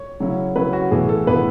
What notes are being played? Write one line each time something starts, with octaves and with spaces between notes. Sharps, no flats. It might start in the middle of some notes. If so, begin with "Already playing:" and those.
Already playing: C#5
C#3 F#3 C#4 E4
C#3 F#3 C#4 E4 B4
F#4
A2 E3 B3 G#4
A4
A2 E3 B3 B4